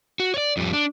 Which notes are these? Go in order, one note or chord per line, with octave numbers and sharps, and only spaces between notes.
F#4
C#5 D5
F2 G3
D4